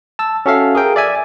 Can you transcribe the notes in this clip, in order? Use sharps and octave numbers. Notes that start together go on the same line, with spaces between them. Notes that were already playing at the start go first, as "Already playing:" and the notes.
A5 E6
C#4 F#4 A4 E5 F5
G#4 A#4 G5
D5 E5 G#5